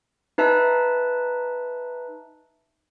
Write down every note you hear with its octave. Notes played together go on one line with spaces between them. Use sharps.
D#4 B4 E5 A5